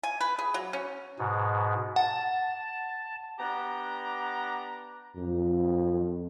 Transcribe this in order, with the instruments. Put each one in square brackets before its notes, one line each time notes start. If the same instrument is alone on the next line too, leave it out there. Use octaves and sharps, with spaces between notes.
[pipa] G#5
B4
G#4
F#3
C#4
[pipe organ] G#2 B2
[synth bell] F#5 [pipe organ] A5
[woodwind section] B3 D4 G4 A#5
[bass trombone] F2